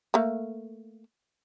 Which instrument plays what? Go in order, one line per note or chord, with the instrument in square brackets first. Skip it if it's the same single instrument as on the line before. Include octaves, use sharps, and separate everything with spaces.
[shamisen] A3 A#3